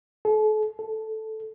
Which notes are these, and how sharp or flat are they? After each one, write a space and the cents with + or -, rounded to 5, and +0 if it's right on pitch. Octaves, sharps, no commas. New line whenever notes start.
A4 -40
A4 -5